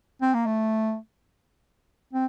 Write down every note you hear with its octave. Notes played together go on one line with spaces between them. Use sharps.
C4
A#3
A3
C4